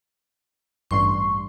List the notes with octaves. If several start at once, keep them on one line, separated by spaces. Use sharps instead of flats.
A1 G2 C6 C#6